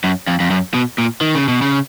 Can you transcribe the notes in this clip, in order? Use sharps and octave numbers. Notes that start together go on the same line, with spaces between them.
F#2
F2
F2
F#2
B2
A#2
D#3
C#3
B2
C#3